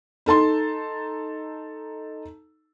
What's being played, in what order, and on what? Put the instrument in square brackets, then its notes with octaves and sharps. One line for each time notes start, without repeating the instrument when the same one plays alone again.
[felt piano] D#4 A4 A5 C6